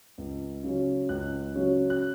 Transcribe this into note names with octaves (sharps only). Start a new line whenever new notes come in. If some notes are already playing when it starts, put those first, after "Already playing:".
C#2
C#3 F#3 C#4
C#2 F#6
C#3 F#3 C#4
F#6